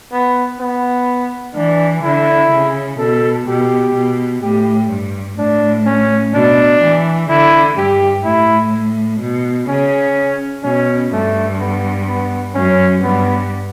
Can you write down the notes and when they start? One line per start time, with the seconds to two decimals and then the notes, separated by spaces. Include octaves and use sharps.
0.12 B3
0.60 B3
1.55 E3 D4
2.03 D3 E4
2.51 C#3
2.98 B2 A4
3.47 B2 G4
3.94 B2
4.42 A2 G4
4.90 G2
5.38 A2 D4
5.86 C#4
6.33 B2 D4
6.82 E3
7.29 D3 E4
7.77 G2 G4
8.24 A2 E4
9.21 B2
9.68 C#3 C#4
10.63 B2 C#4
11.12 G2 A3
11.60 B3
12.08 B3
12.55 F#2 C#4
13.03 G2 B3